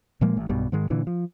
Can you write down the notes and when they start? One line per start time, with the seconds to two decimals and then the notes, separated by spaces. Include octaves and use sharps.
0.21 A#2 F3 G#3 A#3
0.37 A1
0.49 B1 G2 B2 G3
0.72 G#2 D#3 G#3
0.90 A#2 D3 E3
1.07 F3